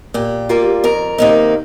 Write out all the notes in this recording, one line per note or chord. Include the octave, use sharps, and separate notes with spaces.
A#2 G4
G3 A#3 F4
F2 A#4
C3 D#3 A#3 D#4